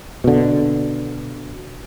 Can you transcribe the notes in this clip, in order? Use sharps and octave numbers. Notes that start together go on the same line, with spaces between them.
B2 D3